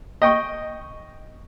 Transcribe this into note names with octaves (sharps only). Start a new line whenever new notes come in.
D#5 G5 C#6